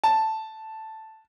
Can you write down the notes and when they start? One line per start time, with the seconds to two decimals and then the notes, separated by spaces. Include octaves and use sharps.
0.04 A5